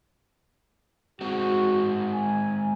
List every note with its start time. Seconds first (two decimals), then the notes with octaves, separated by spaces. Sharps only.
1.21 G#3 C4 F#4
2.13 G#5